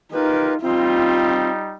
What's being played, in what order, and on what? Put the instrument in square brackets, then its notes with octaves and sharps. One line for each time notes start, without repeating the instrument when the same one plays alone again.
[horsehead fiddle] D#4 [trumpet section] F4 G4 A#4 [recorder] B4
[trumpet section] G3 D#4 [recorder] C4 [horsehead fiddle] F4